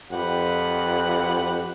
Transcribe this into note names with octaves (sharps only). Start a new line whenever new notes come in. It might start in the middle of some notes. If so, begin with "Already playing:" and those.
F2 G4 B4 F#5